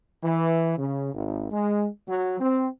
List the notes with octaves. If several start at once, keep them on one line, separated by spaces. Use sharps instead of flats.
E3
C#3
G#1
G#3
F#3
C4